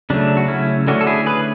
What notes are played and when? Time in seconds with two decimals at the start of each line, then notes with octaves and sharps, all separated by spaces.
0.10 C#3 F#3 A3 D4
0.37 F#4
0.48 C#4 E4
0.87 D3 A3 C#4 D4 F#4
1.01 A4
1.07 E4 G#4
1.26 G#4 B4